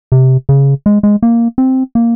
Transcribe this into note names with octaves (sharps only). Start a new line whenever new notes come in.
C3
C#3
G#3
G#3
A#3
C4
A#3